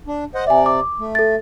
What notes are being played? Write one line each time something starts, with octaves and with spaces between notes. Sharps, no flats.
D4
C5 D#5 F#5
C3 D5 E5 G#5
D6
A3
A4 A6